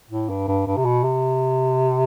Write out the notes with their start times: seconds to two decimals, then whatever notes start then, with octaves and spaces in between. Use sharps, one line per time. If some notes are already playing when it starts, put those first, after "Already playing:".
0.10 A2
0.29 G2
0.48 G2
0.67 G2
0.77 C3
0.85 B2
1.03 C3